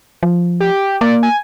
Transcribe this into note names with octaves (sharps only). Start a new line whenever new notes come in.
F3
G4
A#3 D5
G#5